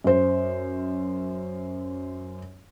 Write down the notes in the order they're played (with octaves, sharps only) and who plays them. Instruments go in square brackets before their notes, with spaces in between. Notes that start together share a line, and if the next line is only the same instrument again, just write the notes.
[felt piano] F#2 C5